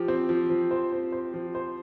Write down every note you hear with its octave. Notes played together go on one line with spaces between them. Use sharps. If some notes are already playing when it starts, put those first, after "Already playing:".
Already playing: F3 G4
C4
F3
F3
C5
C4
C5
F3
C5